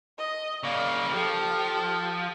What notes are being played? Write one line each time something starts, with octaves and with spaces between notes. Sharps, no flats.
D#5
C#3 A#3 D5 F5
F3 G4 A4